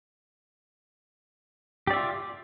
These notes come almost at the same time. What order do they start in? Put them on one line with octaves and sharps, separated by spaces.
G4 D5 E5 F4